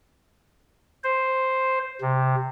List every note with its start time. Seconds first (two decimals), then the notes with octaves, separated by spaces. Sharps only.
1.03 C5
2.01 C3